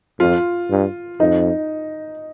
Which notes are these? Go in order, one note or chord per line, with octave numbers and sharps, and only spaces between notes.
F2 F4
G2
F2 D#4